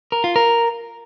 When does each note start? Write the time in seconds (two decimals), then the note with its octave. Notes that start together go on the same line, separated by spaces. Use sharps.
0.12 A#4
0.24 F4
0.36 A#4